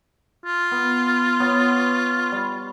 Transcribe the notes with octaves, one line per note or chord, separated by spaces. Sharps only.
F4
B3
B3 C#5
G3